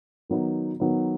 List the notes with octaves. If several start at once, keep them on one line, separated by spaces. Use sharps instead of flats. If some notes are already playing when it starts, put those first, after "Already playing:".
D#3 F#3 B3 D#4
D#3 F#3 B3 D#4